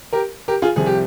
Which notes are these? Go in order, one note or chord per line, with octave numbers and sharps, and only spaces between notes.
G4 A#4
G4 A#4
F4 G#4
C2 C3 F3 G#4
G4